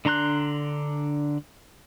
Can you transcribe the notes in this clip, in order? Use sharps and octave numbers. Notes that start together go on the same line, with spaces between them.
D3 D4 A#5 C6 F#6